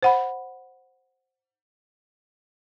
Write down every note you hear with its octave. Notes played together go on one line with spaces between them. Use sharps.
C5 F#5 B5